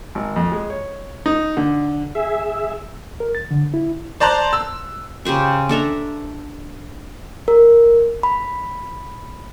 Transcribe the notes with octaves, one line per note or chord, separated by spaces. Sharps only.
G#1
F2
G#3
C#5
D#4
D3
G#4 E5
A#4
A6
D3
E4
C5 D5 A5 A#5 C6 F#6
E6
C#3 G4 C5 C#6
D4 A4 E5 A#5
A#4
B5